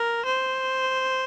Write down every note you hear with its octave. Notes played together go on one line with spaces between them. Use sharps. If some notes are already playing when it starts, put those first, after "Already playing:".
Already playing: A#4
C5